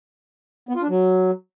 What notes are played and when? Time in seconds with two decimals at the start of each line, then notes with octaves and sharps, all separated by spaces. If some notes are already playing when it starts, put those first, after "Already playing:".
0.69 B3
0.76 F4
0.82 D4
0.89 F#3